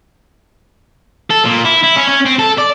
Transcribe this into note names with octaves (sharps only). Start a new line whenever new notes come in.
A4
A#2
E4
E4
C#4
C#4
C4
A4
D5